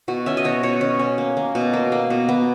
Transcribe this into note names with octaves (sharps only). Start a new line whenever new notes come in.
B2 F#4
C#4 E5
D#5
B2 C#5
B2 C#5
C#4
C#4
A#3
A#3
B2
A#3
A#3
B2
B3